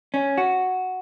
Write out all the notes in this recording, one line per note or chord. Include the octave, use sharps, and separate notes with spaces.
C#4
F#4